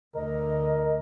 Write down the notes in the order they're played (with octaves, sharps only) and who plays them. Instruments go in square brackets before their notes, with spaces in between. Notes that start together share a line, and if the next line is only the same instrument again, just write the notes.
[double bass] D2 [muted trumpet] A#4 [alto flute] D#5